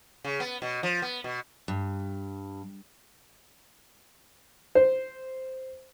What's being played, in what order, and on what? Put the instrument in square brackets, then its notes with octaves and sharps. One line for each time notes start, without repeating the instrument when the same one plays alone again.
[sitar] C#3
B3
B2
F3
B3
B2
[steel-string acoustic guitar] G2
[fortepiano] C5